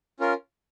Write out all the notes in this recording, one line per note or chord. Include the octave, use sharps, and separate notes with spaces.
C#4 F4 A#4